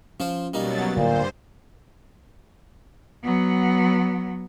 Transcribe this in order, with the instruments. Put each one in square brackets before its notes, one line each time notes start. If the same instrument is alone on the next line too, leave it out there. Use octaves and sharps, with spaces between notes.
[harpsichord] F3 F4 C5 [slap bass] C#4
[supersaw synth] B2 F#3 A6 [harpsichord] G3 A#3 D#4
[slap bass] D1 D2 D3 [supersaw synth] G2 C5 [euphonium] A#2
[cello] F#3 B3